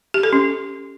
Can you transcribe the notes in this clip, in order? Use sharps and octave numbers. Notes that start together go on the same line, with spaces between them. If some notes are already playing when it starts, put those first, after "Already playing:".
G4
A4
C#4